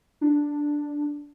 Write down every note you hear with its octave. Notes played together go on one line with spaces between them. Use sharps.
D4